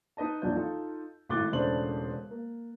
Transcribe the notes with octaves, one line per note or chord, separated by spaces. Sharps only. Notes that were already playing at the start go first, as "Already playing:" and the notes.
D#4 B4 D#5 A5
A#1 F2 E3 F#3 D4 G6
D#4 F4 A4
G#1 A2 D6 F#6 A6 G7
E1 C#3 A3 D4 C5 F#7
A#3